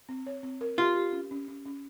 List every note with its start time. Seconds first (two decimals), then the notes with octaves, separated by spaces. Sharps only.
0.09 C4
0.26 C#5
0.43 C4
0.61 A#4
0.78 F4 G4
0.96 G4
1.13 C#4
1.31 C#4
1.48 C#4
1.65 C#4